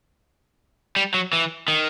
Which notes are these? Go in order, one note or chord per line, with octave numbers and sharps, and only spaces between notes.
G3
F#3
E3
D#3